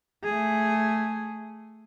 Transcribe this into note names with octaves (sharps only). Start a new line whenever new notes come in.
A3 G#4